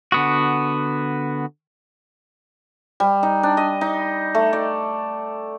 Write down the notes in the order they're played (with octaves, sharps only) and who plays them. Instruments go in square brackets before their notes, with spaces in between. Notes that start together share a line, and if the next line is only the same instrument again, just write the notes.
[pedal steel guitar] D3 B3 F#4
[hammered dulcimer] G3
D#4
D4
D#5
D#4
A3
D5